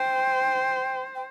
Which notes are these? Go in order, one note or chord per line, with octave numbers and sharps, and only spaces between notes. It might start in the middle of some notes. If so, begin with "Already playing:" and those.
Already playing: C5 G5
G5